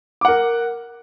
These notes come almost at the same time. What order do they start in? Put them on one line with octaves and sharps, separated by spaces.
D6 F#5 A#4